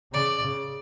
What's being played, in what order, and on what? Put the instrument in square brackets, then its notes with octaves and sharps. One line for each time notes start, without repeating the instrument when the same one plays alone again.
[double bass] C#3 [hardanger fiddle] D5